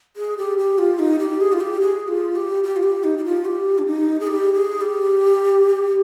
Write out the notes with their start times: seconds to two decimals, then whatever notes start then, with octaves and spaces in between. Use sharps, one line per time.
0.16 G#4
0.37 G4
0.58 G4
0.78 F4
0.99 D#4
1.19 G4
1.41 G#4
1.53 F4
1.60 G4
1.81 G#4
2.08 F4
2.35 G4
2.64 G4
2.76 F4
2.83 G4
3.04 D#4
3.18 G4
3.25 F4
3.45 G4
3.78 D4
3.87 D#4
4.20 G#4
4.27 G4
4.54 G#4
4.81 G4